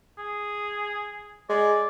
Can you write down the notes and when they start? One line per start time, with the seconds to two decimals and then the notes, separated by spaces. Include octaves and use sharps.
0.18 G#4
1.50 G#3 D5